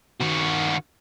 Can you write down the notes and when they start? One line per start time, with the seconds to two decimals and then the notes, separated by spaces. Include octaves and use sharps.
0.20 D#3 F#4